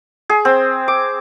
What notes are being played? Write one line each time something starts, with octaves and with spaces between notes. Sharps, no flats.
G#4
C4
D6